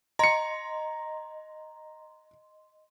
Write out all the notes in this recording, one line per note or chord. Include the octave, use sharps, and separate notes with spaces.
D#5 A#5 C6 C#7